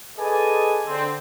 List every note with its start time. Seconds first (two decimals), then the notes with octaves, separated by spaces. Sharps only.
0.17 G#4 A4 B4 D5 D#5 G#5
0.87 D3 C4